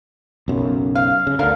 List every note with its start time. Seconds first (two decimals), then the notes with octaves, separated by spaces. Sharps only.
0.48 B1 F#2 C#3
0.95 F5
1.27 C#3
1.39 D2 D3 A#4 F5